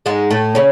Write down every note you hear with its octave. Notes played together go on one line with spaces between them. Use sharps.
G#2 G#3
A2 A3
C#3 C#4